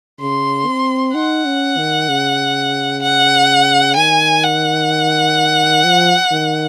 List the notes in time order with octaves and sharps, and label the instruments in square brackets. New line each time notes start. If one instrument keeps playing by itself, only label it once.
[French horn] C#3 [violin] C6
[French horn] C4
[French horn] D#4 [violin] F#5
[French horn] C#4
D#3
C#3
[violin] F#5
[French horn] D#3 [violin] G#5
[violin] F#5
[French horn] F3
D#3